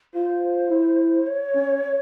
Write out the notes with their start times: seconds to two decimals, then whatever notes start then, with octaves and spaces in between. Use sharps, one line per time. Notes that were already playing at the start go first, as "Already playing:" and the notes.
0.14 F4 C5
0.70 E4
1.27 C#5
1.55 C#4